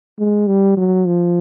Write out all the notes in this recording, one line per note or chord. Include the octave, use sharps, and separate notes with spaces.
G#3
G3
F#3
F3